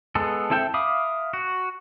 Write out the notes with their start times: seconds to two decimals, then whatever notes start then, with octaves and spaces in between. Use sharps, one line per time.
0.15 G#3 B3 A4
0.50 C4 E4 A4 E5 G5
0.74 E5 F5 B5 D6 D#6
1.34 F#4